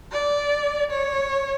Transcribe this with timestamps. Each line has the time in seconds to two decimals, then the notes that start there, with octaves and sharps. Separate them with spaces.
0.12 D5
0.91 C#5